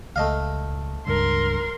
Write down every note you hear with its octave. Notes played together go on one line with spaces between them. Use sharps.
C#2 A3 D#5 F5
C#2 G2 A#4 C6